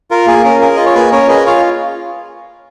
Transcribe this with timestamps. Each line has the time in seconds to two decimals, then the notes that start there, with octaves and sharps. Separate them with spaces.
0.11 F4 A#4
0.27 A#3 G#4
0.44 C#4 A#4
0.61 G#4 A#4
0.76 F4 D#5
0.86 C#5
0.95 A#3 G#4 B4
1.11 C#4 A#4 C#5
1.28 G#4 B4 D#5
1.46 F4 C#5 F5